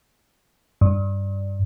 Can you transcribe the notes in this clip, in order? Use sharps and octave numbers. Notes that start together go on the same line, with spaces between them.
G2